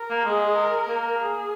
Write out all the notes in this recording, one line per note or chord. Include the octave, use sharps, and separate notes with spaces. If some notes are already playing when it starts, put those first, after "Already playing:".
Already playing: A#4
A#3
G#3 G#4
A#4
A#3
G#4